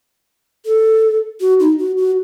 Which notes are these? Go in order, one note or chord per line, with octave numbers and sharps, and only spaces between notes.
A4
F#4
D#4
F#4
F#4